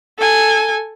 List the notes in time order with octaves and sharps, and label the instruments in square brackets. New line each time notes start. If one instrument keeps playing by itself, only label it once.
[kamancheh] A4 G#5